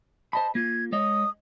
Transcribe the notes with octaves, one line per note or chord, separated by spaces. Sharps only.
C5 D#5 A5 B5
A#3 F4 G#6
G#3 C#5 D#5 D#6